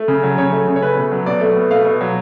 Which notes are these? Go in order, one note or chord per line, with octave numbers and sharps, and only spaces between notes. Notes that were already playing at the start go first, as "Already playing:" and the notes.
Already playing: A3
C#3
F#3
C#3 C#5
A3
C#3
C#5
A3 B4
B2
F#3
B2 D5
A3
B2
A3 F5
B2
F#3